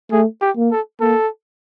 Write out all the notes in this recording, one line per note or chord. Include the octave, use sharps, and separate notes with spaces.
A3 G#4
G4
A#3
A4
A#3 A4